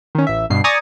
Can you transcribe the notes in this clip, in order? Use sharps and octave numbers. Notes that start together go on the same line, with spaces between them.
D#3 C#4
A1 E5
G2 B2 C7
D5 G#5 A#5 C#6 D#6 A6